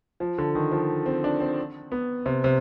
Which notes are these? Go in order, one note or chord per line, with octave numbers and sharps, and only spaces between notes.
F3
D3
D#3
F3
C4
D4
C4
B3
C3
C3